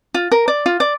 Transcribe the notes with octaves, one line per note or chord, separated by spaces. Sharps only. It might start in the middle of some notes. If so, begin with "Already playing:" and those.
F4
A#4
D5
F4
D5